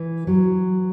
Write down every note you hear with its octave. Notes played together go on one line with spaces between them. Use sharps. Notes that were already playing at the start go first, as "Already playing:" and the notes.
Already playing: E3
F#3